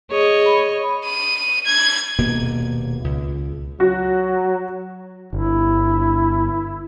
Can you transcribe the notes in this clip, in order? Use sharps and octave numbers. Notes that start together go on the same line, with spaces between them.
G#4 C#5 D#5
B5
D#7
G#6
D#1 B2 A#3
C#2
F#3 F#4
G1 E4